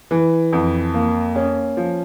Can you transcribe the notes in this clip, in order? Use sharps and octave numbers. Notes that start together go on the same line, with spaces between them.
E3
F2
A#3
C#4
F3